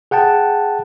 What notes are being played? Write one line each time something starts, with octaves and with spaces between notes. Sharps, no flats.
G#4 F#5 G5 A5